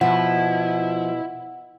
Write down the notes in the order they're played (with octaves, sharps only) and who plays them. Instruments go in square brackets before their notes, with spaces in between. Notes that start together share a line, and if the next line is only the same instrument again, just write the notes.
[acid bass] B2 [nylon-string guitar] F3 [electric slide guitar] E4 [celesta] F#5